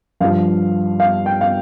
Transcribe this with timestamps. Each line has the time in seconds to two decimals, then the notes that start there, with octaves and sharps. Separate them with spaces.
0.21 G2 F3 F5
1.00 F5
1.26 G5
1.41 F5